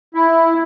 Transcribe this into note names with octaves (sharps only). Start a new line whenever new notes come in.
E4